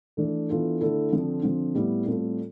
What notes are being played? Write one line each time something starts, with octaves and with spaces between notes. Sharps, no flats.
E3 A3 D4 A4
E3 B3 D4 F4 A4
D3 A3 E4 A4
D3 F3 C4 F4 A4
D3 F3 C4
A2 G3 B3 E4
A2 G3 C4 F4 A4